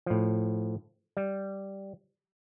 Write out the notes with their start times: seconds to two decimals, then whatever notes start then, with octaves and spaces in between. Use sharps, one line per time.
0.06 A2 F3
1.17 G3